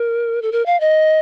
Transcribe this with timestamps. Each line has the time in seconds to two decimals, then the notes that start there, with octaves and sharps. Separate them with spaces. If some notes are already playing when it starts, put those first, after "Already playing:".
Already playing: A#4
0.42 A4
0.52 A#4
0.66 F5
0.80 D#5